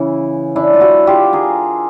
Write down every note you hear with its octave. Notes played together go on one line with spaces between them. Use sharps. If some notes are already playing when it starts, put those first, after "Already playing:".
Already playing: C#3 E3
D4 E4
F4
E4 F#4
F4 G4
G#4 A#4